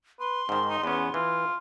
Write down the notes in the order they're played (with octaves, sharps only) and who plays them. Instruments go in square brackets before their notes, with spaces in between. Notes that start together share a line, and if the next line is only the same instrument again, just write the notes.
[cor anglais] B4 [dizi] C6
[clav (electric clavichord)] G#2 D#3 [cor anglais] C4
[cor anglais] D#4
[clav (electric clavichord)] E2 C#4 [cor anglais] B3
[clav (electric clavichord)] E3 [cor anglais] F4